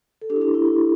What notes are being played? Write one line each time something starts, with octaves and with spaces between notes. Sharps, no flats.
A4
D4 G4
E4
D4 G4
E4
E4